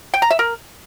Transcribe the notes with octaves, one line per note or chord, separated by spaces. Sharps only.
G5
A#5
E5
A#4